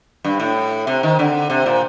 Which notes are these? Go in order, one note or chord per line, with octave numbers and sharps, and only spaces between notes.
G2
A2
C3
D#3
D3
C3
A#2